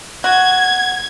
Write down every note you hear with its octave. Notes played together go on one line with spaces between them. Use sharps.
F#4 G#6